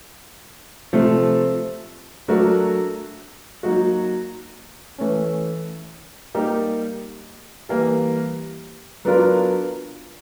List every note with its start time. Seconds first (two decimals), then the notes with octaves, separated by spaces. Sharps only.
0.93 C3 F3 A3 C4
2.28 F#3 A3 D4 F#4 A#4
3.63 F#3 A#3 D#4 F#4
4.98 E3 A3 C#4
6.34 G3 A#3 D#4 G4 A#4
7.69 E3 G3 A#3
9.05 F#3 B3 D4 F4 A#4